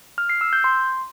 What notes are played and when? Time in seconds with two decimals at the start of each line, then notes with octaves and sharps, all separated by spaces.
0.18 F6
0.29 C7
0.41 E6
0.53 G6
0.64 C6